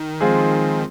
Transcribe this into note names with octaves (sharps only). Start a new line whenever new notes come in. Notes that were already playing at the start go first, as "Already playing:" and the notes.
Already playing: D#3
F3 G#3 C4 F4 G#4